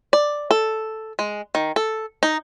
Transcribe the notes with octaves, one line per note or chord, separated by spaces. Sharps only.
D5
A4
G#3
D#3
A4
D#4